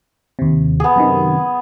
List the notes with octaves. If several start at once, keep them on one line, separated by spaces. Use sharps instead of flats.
D#2 C3
B3 G#4
F#2 C3 D#3